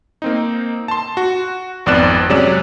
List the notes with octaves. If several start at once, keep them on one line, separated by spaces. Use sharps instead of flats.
A#3 C4 D#4
A5 C6
F#4
G#1 F2 B3 D5 F#6 E7
C3 F#3 G#3 C#4 D5 E7